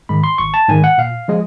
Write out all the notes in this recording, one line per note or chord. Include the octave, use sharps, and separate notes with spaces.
G#2 D#3 G#3 B5
C6
G#1 C#6
A5
G#2 D#3 G#3 G#5
F#5
A#2 F5
F3 G#3